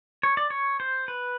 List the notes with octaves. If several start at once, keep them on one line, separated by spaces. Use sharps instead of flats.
C#5
D5
C#5
C5
B4